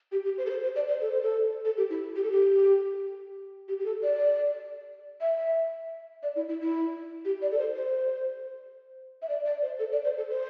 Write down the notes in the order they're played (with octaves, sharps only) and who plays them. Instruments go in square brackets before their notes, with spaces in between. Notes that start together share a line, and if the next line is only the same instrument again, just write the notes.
[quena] G4
G4
C5
A4
C5
C5
D5
C5
A4
C5
A4
A4
G4
E4
G4
A4
G4
G4
G4
A4
D5
E5
D5
E4
E4
E4
G4
D5
A4
C5
C5
E5
D5
D5
C5
A4
D5
C5
A4
C5